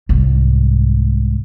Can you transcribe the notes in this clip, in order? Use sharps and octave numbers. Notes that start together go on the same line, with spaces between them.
C2 G#2